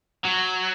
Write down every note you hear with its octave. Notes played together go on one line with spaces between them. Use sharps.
F#3